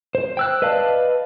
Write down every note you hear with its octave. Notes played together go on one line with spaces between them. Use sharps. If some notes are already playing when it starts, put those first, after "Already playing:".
C5
G5 E6 F#6
B4 D5 D#5 F5 A5